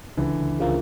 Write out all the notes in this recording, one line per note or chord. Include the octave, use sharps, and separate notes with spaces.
C#2 D3 E3
C#3 F3 A#3